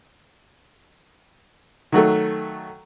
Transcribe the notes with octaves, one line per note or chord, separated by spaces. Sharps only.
D#3 F#3 A3